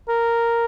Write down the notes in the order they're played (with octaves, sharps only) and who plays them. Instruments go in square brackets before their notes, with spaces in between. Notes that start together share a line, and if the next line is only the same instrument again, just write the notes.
[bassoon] A#4